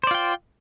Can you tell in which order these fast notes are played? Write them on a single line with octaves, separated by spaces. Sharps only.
C5 D5 F4 G5